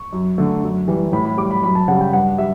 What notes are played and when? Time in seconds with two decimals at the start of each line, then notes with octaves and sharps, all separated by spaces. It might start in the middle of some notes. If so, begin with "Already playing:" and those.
Already playing: C#6
0.13 F#2
0.38 D3 A3
0.63 F#2
0.88 E3 G3
1.13 A2 B5
1.25 B5
1.37 G3 D6
1.51 B5
1.63 F#2 B5
1.75 A5
1.88 C#3 G3 F#5
2.01 G5
2.13 G2 F#5
2.38 G3 E5